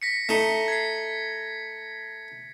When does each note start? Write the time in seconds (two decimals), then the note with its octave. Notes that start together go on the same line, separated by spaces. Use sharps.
0.02 A#6 B6 C#7
0.29 A3 D#4
0.68 G#6 C7